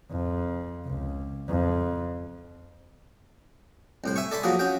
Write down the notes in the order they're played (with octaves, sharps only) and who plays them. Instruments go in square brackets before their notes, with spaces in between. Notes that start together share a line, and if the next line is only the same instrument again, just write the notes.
[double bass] F2
C#2
F2
[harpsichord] C2 A2 C5
E5 G#5 C#6
A4 D5 G#5 B5 C6
F3 F#3 A#3 F#4 G#4
C#4 F#4 G5